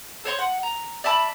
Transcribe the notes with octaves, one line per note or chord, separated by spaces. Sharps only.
A4 C5 C#5 C6
F#5
A#5
D5 E5 A5 B5